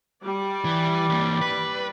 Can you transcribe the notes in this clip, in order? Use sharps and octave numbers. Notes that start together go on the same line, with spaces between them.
G3 D5
E3
E3 A#3
B4